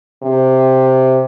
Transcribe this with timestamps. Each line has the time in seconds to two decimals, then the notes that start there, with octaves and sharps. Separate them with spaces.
0.23 C3